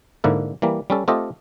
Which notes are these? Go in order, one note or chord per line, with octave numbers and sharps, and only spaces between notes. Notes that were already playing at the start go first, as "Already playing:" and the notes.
G#2 D3 A#3 E4
E3 G3 A#3
G3 C#4 A4
A3 C4 F4 G4 A4 D#5